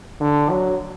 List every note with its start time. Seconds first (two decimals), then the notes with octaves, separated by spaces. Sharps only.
0.21 D3
0.50 F#3